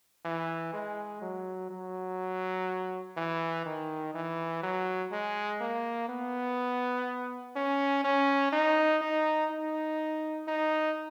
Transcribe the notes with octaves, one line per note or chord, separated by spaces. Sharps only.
E3
G#3
F#3
F#3
E3
D#3
E3
F#3
G#3
A#3
B3
C#4
C#4
D#4
D#4
D#4
D#4